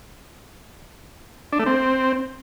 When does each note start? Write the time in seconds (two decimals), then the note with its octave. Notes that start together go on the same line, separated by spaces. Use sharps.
1.53 D4
1.59 A3
1.66 C4